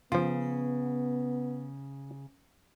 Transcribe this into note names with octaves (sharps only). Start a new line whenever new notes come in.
C#3 F3 B3 F4